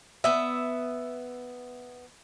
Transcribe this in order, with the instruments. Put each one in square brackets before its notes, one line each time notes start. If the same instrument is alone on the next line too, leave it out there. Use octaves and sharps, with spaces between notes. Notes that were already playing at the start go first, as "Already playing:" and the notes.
[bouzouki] B3 E5